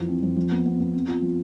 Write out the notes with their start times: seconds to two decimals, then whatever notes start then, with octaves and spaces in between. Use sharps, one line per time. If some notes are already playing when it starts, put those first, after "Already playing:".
Already playing: F2 E3 F3
0.08 C4
0.23 F2
0.36 F3
0.51 B3
0.66 B3
0.80 B3
0.94 C4
1.08 F4
1.22 F3